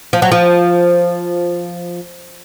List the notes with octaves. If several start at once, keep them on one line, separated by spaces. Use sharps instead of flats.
F3
F#3
F3